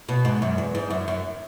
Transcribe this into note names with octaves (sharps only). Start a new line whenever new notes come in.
B2
G#2
F#2
E2
G#2
F#2
F#2